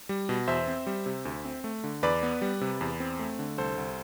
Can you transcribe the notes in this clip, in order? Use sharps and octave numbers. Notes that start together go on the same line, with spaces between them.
G3
B2
E2 C5 E5
C4
G3
C3
D2
C4
A3
D3
E2 B4 D5
B3
G3
C3
E2
C4
A3
D3
C2 A4 C5
C2